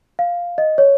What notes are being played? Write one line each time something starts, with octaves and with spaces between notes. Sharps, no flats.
F5
D#5
C#5